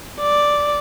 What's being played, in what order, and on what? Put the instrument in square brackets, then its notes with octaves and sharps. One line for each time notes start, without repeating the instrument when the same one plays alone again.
[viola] D5